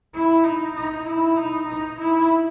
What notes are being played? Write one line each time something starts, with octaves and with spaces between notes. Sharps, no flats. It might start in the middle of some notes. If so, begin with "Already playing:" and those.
E4
D#4
D#4
E4
D#4
D#4
E4